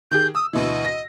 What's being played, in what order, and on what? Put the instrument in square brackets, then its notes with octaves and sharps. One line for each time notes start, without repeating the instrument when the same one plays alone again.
[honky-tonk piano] D#3 G4 G#4 [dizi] G6
[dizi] D#6 [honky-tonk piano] E6
[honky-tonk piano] D2 B2 E3 [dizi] D#5
[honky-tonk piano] A#6